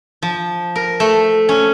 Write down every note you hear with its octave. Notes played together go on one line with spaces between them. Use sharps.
F3
A#4
A3
C#4